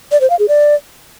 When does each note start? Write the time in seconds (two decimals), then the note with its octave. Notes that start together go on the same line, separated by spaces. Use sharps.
0.12 D5
0.21 C5
0.30 F5
0.39 G#4
0.48 D5